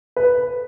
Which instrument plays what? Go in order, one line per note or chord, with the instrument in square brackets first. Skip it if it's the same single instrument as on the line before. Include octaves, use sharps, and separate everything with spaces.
[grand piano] B4